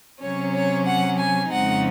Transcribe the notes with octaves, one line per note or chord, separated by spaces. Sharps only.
C3 F#3 C#4 C#5
C#5
F#5
G#5
F2 C#3 G#3 C4 D#4 F#5